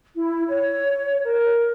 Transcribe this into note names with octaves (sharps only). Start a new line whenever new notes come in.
E4
C#5
A#4